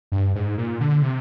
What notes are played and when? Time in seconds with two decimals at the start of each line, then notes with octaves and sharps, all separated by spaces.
0.12 G2
0.35 G#2
0.58 A#2
0.80 D3
1.02 C3